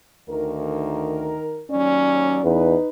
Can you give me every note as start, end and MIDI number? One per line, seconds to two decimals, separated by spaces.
0.29 1.37 38
0.29 1.63 51
0.29 1.63 70
1.70 2.39 39
1.70 2.39 54
1.70 2.54 61
1.70 2.39 74
2.44 2.75 40
2.44 2.89 63
2.44 2.89 71